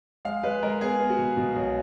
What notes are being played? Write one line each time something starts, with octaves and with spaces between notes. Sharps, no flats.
G#3 F5
G#3 B4
G#3 A#4
B3 G#4
B3
F#4
B2
B2
B1